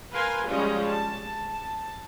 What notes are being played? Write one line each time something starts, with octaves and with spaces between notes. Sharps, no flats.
A#4 B4 F5 G#5 C6
F3 G3 G#3 C#4 F4 D#5
A5
A5